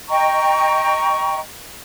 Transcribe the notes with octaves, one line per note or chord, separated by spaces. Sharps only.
D#5 G5 A#5 C#6